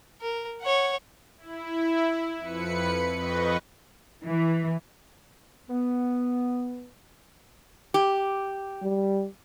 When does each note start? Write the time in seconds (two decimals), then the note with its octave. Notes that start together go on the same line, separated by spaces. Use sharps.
0.21 A#4
0.61 C#5 F#5
1.38 E4
2.38 F2 B4 B5 C#7
3.16 F2 B4 D#5 C#6
4.24 E3
5.70 B3
7.94 G4
8.82 G3